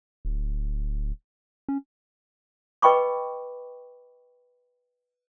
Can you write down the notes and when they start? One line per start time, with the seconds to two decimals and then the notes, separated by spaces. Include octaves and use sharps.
0.25 D1
1.69 C#4
2.82 B4 D#5 G5 B5 C#6 D6